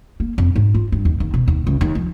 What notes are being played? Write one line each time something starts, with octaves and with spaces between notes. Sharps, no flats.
A#3
F2
G#2
F4
G2
D#2
D#2
B2
D#2
C#2
D#2
F3